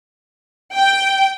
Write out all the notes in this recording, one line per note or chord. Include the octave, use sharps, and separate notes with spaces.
G5